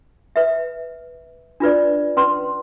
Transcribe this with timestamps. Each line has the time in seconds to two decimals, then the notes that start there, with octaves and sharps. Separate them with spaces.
0.36 B4 E5
1.60 D4 F4 B4 D5
2.17 C#4 B4 C6